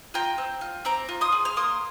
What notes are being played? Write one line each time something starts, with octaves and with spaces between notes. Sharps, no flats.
F4 G5 A#5
C4
F4
C4 A#5 D6
F4
C6 D#6
G#4
F6
A#3 C6 D#6